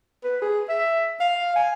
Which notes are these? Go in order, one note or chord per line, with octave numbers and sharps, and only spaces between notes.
B4
G#4
E5
F5
G#5